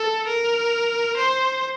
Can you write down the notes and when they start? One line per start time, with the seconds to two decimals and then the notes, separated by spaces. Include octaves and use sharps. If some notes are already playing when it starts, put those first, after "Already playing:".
Already playing: A4
0.28 A#4
1.17 C5